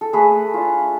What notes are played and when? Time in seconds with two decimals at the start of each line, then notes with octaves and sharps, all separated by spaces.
0.01 A4
0.13 A3 G#4 B4
0.54 D4 F4